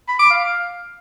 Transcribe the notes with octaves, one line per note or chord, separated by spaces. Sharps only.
B5
D6
F5